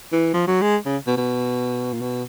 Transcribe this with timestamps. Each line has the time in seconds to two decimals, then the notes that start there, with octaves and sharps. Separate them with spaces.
0.12 E3
0.33 F3
0.47 F#3
0.62 G#3
0.86 C#3
1.07 B2
1.17 B2
1.93 A#2
2.01 B2